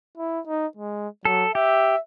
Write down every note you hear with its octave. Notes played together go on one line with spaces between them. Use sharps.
E4
D#4
G#3
F#3 A4
G4 E5